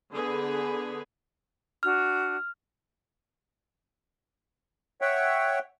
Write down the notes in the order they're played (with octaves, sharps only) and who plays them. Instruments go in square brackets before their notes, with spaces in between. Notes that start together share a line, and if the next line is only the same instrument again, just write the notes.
[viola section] D3 B3 G#4 B4
[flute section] D4 F#4 [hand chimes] F6
[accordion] C#5 E5 F#5 G5